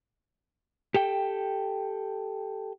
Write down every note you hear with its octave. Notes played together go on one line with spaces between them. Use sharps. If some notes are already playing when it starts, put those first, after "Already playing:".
G4 A4 G5